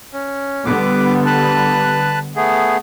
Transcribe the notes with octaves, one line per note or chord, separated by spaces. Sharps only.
C#4
D3 G3 B3 B4 D6
B4 A5 F#6
A3 B3 G#4